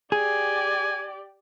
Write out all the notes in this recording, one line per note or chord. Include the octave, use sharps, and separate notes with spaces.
G4 G#4 D5 G#5